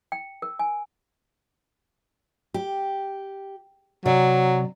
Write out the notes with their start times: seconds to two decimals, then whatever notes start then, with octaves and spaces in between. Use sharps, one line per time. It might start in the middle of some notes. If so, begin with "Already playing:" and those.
0.12 G5
0.42 A#4
0.59 G#5
2.54 G4
4.06 C3 F#3 D5